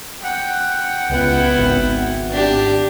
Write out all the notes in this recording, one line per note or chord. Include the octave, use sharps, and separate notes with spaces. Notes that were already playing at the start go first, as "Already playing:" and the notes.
F#5 G5
C#2 B3 E4
G#1
D4 G4